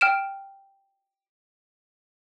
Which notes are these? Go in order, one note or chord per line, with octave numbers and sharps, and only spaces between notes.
G5 F6 D7 E7